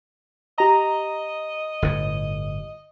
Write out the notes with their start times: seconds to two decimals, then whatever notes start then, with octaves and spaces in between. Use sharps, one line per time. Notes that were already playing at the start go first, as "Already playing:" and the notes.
0.58 G4 D#5 A#5
1.82 G1 A2